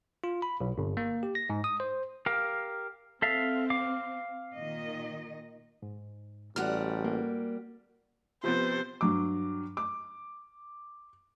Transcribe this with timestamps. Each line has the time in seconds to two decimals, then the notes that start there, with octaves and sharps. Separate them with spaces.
0.24 F4
0.42 B5
0.60 B1
0.78 G1
0.97 A#3
1.23 G4
1.35 A#6
1.49 G#2
1.64 D#6
1.80 C5
2.26 G4 A#4 F5
3.22 C4 A4 E5 F5
3.70 F5 D6
4.56 A#2 D#3 D#5
5.82 G#2
6.56 A1 G3 F#4 F#5 F6
7.05 A#3
8.43 C3 F3 B3 C5
9.01 G2 F#3 D6
9.77 D6